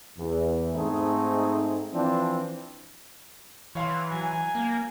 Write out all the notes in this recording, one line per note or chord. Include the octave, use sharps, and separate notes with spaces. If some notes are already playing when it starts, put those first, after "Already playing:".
E2
G#2 A3 C4 D#4 G#4
E3 F3 C4 D4
E3 C#5 F5 C6
F#3 G#5
A#3